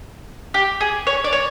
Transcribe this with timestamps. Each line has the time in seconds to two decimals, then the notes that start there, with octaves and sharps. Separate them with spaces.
0.54 G4
0.81 G#4
1.07 C#5
1.24 D5
1.33 C#5